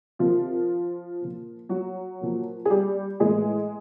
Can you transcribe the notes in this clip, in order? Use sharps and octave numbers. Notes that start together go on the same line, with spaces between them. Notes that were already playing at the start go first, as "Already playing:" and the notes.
C3 D#3 F3 F4
A#2 F3
F#3 F#4
A#2 F3
G#4
G3 G4
A2 E3 G#3 G#4